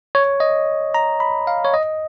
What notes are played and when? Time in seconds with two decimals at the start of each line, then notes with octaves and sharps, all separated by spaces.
0.15 C#5
0.40 D#5
0.94 A#5
1.20 B5
1.47 F5
1.65 C#5
1.74 D#5